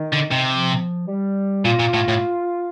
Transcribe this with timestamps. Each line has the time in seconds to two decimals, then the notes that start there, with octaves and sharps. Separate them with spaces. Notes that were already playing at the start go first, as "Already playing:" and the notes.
Already playing: D#3
0.13 D3
0.31 C3
0.50 F3
1.07 G3
1.65 A#2 F4
1.80 A#2
1.94 A2
2.08 A2